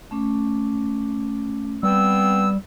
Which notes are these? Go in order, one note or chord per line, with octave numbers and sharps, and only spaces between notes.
A3 C#4 D6
G3 B3 C4 E6